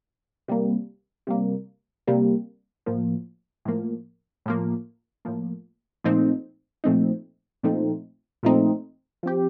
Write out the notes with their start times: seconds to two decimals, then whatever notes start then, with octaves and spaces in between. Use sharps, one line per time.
0.48 C3 G3 A#3
1.27 C3 G3 A#3
2.07 C3 G3 A#3
2.86 A2 F3 A#3
3.65 A2 F3 A#3
4.46 A2 F3 A#3
5.25 A2 F3 A#3
6.04 A#2 F3 A3 C4 D#4
6.84 A#2 F3 A3 C4 D#4
7.63 A#2 F3 A3 C4 D#4
8.43 A#2 F3 A3 C4 D#4
9.23 F3 C4 G4